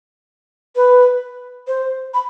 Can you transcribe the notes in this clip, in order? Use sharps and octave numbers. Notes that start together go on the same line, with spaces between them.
B4
C5
B5